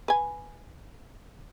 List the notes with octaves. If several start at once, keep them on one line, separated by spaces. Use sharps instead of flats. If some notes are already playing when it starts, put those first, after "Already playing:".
B4 G#5